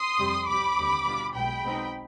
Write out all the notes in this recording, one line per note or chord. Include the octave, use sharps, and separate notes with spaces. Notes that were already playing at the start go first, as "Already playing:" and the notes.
Already playing: C6 D#6
F2 C3 G3
C2 C3 G3 B5 D6
D#2 D3 G3 C4
B2 G3 D4 F4
B1 B2 G#3 G5 B5
B2 G#3 C4 D#4